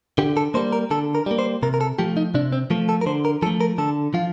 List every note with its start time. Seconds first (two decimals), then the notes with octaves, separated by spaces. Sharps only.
0.18 D3 G4
0.37 A4
0.54 G3 A#3 C5
0.72 A#4
0.91 D3 A4
1.15 A#4
1.26 G3 A#3
1.39 C5
1.63 C3 A#4
1.74 A#4
1.81 A4
1.99 F3 A3 G4
2.17 D#4
2.34 C3 D4
2.52 C4
2.70 F3 A3
2.89 A4
3.01 A#4
3.06 D3 C5
3.25 A#4
3.42 F3 A4
3.46 A3
3.61 A#4
3.78 D3 A4
4.14 F3 F4